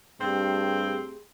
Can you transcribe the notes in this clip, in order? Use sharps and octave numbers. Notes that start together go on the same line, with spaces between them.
G2 A3 C4 G4 G#4